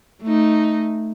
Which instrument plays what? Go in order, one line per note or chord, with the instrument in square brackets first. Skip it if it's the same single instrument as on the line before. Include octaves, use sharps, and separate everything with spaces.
[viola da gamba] A3 D#4